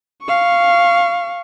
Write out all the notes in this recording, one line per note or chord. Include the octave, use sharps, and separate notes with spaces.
F5 C#6